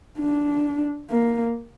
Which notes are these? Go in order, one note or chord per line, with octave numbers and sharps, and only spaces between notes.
D4
A#3